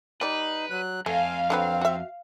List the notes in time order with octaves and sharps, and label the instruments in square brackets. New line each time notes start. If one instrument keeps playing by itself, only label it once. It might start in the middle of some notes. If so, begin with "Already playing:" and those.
[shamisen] G3 D5 [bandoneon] D#4 [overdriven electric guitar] B4
[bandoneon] F#3 F#6
[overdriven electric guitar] F2 [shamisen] A3 [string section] F5 [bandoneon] G#5
[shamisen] D3 F#3 B4 [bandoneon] C4
[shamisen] F#4 E5